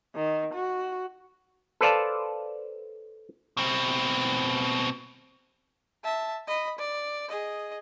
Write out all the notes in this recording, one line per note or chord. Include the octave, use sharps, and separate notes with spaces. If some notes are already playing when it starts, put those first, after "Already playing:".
D#3
F#4
A4 B4 C5 D5 F5 A5
B2 C4
E5 A5
D#5 B5
D5
G#4 D#5